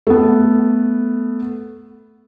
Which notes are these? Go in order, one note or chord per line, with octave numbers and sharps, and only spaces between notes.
A3 B3